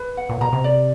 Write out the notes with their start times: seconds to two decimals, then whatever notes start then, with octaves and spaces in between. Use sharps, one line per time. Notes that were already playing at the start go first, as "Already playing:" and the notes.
Already playing: B4
0.17 F#5
0.29 A#2
0.41 B2 A#5
0.53 C3
0.64 D5